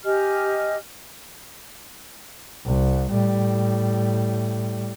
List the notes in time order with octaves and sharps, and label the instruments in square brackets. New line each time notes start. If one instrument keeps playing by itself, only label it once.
[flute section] G4 D#5 G#5 F6
[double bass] C2
A2 G3